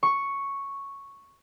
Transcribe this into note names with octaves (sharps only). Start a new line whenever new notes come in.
C#6